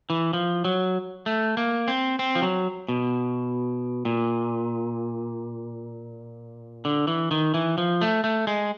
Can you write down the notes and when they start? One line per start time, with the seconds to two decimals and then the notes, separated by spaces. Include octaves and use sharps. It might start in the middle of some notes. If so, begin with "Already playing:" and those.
0.10 E3
0.33 F3
0.65 F#3
1.26 A3
1.57 A#3
1.88 C4
2.19 C4
2.35 F3
2.42 F#3
2.89 B2
4.05 A#2
6.85 D3
7.07 E3
7.31 D#3
7.54 E3
7.78 F3
8.01 A3
8.24 A3
8.47 G#3